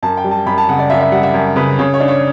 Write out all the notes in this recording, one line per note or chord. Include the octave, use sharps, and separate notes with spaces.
F#2 A5
G5
G3
A5
F#2 B5
A5
C#3 F#5
D5
F#2 E5
E5
G3 F#5
E5
F#2
C#3 B4
C#3 C#5
C#5
D4
C#5